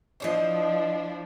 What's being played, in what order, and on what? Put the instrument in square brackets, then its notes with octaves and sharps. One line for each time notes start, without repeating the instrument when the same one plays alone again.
[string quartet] F3 D4 E4 [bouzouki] C5 C#5 D#5